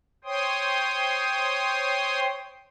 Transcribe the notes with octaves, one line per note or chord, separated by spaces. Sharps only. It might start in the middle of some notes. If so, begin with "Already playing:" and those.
C5 C#5 G5 C6 D#6